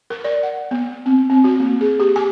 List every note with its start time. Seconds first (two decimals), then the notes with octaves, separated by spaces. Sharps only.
0.10 A#4
0.24 D5
0.43 F#5
0.71 B3
1.06 C4
1.30 C4
1.44 F#4
1.60 A#3
1.81 G#4
2.00 G4
2.16 G#5